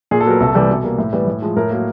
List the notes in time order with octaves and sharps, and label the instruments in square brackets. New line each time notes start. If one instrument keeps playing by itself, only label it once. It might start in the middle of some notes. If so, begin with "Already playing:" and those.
[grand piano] A#2 G#4
A4
F#3 B3 A#4
C2 A4
C3 E3 G3
B2
G3 A#3
A2
E3 G3 B3
A2
F3 G#3
A2 A#4
F#3 A#3